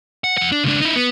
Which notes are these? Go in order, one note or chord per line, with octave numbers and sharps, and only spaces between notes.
F#5
F2 F#5
D4
C#2 D4
D#4 E4
B3